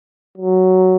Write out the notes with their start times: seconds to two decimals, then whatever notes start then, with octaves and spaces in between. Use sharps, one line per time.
0.38 F#3